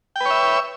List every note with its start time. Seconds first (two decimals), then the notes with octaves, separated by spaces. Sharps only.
0.16 G5
0.20 B4
0.25 C#5
0.30 E5